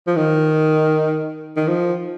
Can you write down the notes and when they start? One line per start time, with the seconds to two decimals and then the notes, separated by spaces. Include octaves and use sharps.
0.08 F3
0.16 D#3
1.57 D#3
1.67 F3